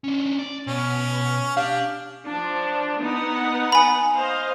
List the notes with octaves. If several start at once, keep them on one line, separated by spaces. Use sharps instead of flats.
C#4 D4
D5
B2 C#4
D4 G4 F5
F3 D4
B3 D#4 F#5
G#5 B5
C5 D#5 F5